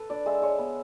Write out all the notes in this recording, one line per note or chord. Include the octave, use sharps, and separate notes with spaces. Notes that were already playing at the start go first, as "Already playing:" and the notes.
Already playing: A4 B4
D4 D5
G#3 E5
G#3 C#5
B3